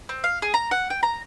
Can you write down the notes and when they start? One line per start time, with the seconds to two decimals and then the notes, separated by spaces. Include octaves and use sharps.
0.09 C4
0.24 F5
0.42 G#4
0.54 A#5
0.71 F#5
0.90 G5
1.03 A#5